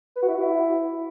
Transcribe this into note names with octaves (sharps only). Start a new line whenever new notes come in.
B4
F#4
E4
F#4
E4